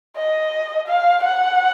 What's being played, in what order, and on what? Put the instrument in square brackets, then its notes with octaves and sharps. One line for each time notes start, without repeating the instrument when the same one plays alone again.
[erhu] D#5
F5
F#5